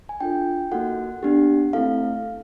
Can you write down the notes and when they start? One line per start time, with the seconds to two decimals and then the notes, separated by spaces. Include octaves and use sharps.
0.09 G#5
0.21 D4 F4 A4 G5
0.71 A#3 D#4 F#4 A4 F#5
1.23 B3 D4 G4
1.73 A3 C4 E4 A4 F5